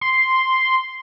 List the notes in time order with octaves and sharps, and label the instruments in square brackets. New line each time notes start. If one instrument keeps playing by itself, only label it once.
[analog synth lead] C6